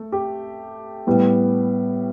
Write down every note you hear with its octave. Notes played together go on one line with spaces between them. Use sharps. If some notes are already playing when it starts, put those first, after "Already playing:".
Already playing: A3
G4
A2 G3 B3